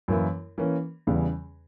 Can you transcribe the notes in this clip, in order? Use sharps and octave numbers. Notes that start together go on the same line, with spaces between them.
F#2 E3 A#3 E4
E3 A#3 C#4
E2 C#3 E3 G3